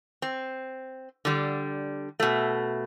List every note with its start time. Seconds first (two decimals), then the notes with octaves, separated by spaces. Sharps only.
0.22 C4
1.25 D3 G3
2.20 B2 A3